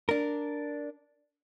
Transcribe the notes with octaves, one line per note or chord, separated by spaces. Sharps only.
D4 A#4